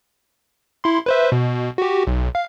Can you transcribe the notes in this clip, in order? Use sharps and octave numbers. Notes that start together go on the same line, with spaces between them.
E4 C6
B4 C5 E5
B2
F#4 G4
B1
F5